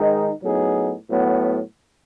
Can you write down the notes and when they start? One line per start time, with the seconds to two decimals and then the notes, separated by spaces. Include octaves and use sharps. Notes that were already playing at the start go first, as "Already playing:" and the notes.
Already playing: G#2 D#3 G#3 D#4
0.43 A2 F#3 B3 D#4 G#4
1.07 A2 F#3 B3